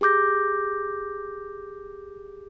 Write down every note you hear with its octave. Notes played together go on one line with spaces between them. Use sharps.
G4 G#4 D6 G6 A#6